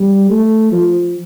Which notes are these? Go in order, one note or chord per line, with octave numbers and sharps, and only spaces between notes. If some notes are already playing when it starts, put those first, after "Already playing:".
Already playing: G3
A3
F3